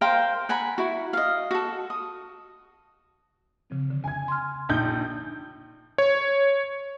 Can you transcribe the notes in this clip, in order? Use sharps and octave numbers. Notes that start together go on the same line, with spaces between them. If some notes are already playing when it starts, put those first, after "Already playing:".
A#4 C5 F5 G5
F#5 G#5 A#5 B5
E4 F#4
D#5 F5
F#4 A4
D#6
C#3 F3 C4
D3
G#5 G#6
C6 F6
A#1 D4 D#4 G6
C#5